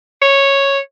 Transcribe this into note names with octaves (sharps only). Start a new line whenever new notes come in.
C#5